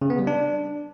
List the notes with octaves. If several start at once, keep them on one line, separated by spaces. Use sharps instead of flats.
C#3
B3
G3
D4